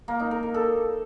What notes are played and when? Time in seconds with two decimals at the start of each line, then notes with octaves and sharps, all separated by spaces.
0.08 A#3
0.20 D#4
0.31 A#4
0.43 A#4
0.54 A4